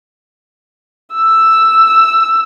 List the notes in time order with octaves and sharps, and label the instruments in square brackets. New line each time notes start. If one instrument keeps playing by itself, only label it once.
[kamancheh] E6